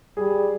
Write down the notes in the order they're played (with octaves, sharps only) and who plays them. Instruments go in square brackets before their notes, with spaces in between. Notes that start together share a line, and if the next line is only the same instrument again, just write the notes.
[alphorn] G3 [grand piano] G#4